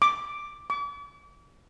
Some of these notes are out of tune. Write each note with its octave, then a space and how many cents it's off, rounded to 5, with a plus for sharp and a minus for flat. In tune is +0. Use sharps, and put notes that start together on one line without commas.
D6 +0
D6 -40